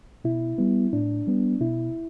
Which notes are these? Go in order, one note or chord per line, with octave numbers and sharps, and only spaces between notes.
B2 E4
G3 B3
A2 D4
G3 B3
B2 E4